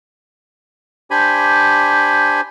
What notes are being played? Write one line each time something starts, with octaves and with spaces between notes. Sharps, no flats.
D4 G4 C5 G#5 B5